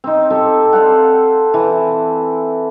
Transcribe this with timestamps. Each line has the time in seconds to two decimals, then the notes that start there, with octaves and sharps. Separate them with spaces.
0.04 C4 D#4
0.30 C4 G4 A4
0.73 C5 D5 F5 F#5
1.54 E3